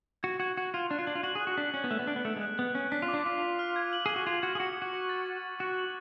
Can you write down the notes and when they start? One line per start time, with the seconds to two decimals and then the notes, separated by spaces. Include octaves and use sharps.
0.23 F#4 G#6
0.40 F#4 G#6
0.57 F#4 G#6
0.74 F4 G#6
0.90 D4 F#6
0.99 F4
1.07 D4 F#7
1.15 F4
1.23 F#4 F#7
1.35 G#4
1.41 F#6
1.47 F#4
1.57 D4 B6
1.74 C#4 F#6
1.84 B3
1.91 A3 F#6
1.99 B3
2.07 D4 D7
2.16 B3
2.25 A3 C#7
2.36 G#3
2.41 F#6
2.58 B3 F#6
2.75 C#4 F#6
2.92 D4 B6
3.02 F4
3.08 D6
3.14 D4
3.26 F4 B6
3.42 B6
3.59 F6
3.76 G#6
3.93 F#7
4.06 G#4 F#7
4.16 F#4
4.26 F4 G#6
4.43 F#4 G#6
4.55 G#4
4.60 F#4 C#7
4.76 G#6
4.82 F#4
4.93 C#6
5.09 A6
5.26 A6
5.43 C#6
5.60 F#4 F#6
5.77 F#7